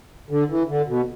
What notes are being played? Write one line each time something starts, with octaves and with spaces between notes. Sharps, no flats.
D3
E3
D3
B2